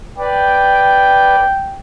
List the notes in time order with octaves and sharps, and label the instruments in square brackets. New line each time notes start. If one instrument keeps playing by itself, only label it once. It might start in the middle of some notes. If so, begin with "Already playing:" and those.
[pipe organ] B4 D5 [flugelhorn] G5